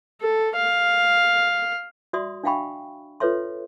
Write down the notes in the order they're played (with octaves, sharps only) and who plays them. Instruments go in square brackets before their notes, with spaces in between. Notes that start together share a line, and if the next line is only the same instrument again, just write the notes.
[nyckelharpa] A4
F5
[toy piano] F#4 D5 E5 C6 D#6
D4 E5 F5 G5 B5 C#6
F4 A4 B4 C#5 E5 C6